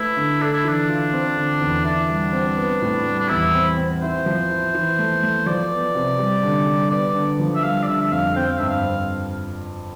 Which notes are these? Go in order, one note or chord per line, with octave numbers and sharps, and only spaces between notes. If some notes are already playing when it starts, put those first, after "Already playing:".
Already playing: A3 E4 B4
D3
D4 A4
E4
E3 D4
F4
C4
D3
E2
D4 E4
G3
C4
B3
A2
G3
D4
E2 E4
C4
C4
E4 C5
F3
E4
E3
A3
A3
F3 D5
B3
C3
G3
D3
G3
B3 D5
D3
F3
E5
G3 F5
D5
D3 E5
E5
F2 F5
C4 G5
F5
G2 E5
F5
C4